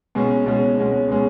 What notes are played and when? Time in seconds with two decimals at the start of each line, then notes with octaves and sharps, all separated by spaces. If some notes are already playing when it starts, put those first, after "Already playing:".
0.15 B2 G#3 C#4
0.46 B2 G#3 C#4
0.78 B2 G#3 C#4
1.09 B2 G#3 C#4